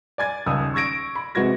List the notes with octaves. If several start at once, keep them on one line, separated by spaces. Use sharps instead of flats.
D5 G#5 G#6 A6
D#1 C#2 D#6 E6
C#6 E6 G#6 A#6 D7
B5
C3 G#3 F#4 B4 G#6 A#6